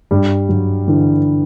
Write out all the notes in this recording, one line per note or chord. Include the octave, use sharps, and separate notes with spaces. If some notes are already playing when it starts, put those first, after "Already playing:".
G2 G3
G2 F#3
D3 E3